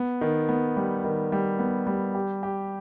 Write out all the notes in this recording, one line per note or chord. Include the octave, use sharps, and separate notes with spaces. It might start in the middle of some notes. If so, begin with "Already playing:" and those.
Already playing: B3
D#3
B3
G3
D#3
G3
B3
G3
G4
G4